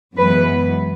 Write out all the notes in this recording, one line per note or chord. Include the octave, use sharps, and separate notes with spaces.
F#2 E3 G#3 B3 B4